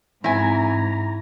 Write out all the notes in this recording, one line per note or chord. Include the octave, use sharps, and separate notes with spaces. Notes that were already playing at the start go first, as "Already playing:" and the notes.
G#2 E3 C4 E4 G#5 A#5